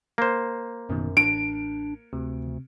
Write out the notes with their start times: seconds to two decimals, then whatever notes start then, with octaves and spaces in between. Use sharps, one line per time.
0.18 A#3 C5
0.89 A1 F#2 B2 D#3
1.17 A1 D4 D7
2.13 D2 C3